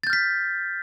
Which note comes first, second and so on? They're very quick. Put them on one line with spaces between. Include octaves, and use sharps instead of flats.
A6 G6 F6 B6